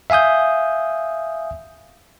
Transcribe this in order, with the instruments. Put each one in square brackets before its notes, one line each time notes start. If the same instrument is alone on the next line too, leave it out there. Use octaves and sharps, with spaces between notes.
[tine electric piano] E5 F5 G#5 D#6 G6